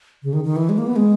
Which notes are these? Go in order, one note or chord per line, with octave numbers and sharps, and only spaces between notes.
C#3
D#3
D#3
E3
G#3
A#3
B3
G#3